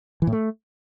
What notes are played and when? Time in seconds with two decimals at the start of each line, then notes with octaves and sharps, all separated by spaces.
0.22 E3
0.27 A2
0.33 A3